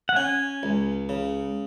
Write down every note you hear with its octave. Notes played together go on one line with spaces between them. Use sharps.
F#5
C#4 G#5
C#2
C#3